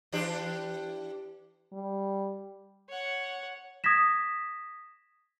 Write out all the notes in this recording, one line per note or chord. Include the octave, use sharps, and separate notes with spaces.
E3 D4 G4
G3
C#5 F#5
D#6 G#6 A#6 B6 E7